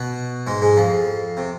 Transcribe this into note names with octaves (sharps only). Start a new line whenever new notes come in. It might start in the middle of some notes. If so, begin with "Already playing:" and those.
Already playing: B2 B3
G#2 G#3
G#2 G#3
F2 F3
C3